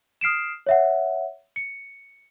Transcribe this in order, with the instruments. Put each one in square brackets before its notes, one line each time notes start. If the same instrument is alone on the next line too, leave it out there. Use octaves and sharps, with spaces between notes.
[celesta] D#6 F6 C7 D7 E7
C#5 E5 F#5
C#7